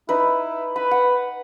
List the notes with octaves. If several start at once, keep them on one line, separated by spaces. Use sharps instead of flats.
D#4 E4 B4
B4 B5
F#5